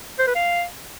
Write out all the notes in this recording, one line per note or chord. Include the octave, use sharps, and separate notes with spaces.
C5
B4
F5